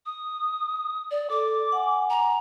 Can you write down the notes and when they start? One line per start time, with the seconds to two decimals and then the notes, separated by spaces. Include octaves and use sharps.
0.06 D#6
1.11 D5
1.30 A4 D6
1.72 F#5 G#5
2.10 A#5